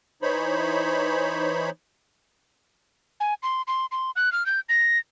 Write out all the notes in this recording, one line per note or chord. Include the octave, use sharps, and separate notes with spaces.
E3 D#4 C5 C#5 B5
G#5
C6
C6
C6
F#6
F6
G6
A#6